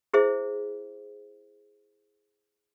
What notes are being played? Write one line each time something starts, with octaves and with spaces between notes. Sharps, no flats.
E4 G#4 C5 E5